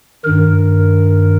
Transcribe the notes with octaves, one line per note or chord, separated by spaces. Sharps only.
G2 D#3 A#4